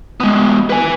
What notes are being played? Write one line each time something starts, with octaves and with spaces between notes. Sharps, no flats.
G#3 B3
B4 G#5